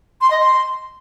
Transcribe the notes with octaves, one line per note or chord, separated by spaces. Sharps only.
C6
D#5
C6